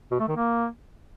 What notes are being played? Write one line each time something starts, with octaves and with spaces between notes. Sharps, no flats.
B2
A3
D#3
A#3